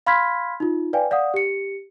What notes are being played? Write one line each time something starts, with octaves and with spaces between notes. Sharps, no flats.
F5 B5 C6 F6 G#6 B6
D#4 F4
B4 D5 F5 G5 G#5
D5 F5 F#5 D#6
G4 C#7